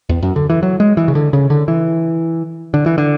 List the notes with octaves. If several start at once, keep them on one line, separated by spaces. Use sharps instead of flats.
E2
F#2
D3
E3
F#3
G#3
E3
C#3
D3
C#3
D3
E3
D3
E3
D3